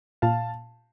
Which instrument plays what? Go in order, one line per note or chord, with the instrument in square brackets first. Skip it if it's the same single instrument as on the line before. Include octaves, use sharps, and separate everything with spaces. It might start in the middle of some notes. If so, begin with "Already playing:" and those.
[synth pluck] A#2 [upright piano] F5 A5